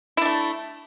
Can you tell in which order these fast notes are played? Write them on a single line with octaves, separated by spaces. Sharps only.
E4 D4 A3